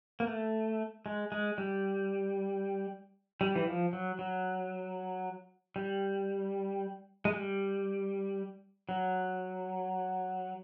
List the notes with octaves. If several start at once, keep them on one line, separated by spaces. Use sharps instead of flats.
A#3
A3
G#3
G#3
G3
G3
E3
F3
F#3
F#3
G3
G#3
G3
F#3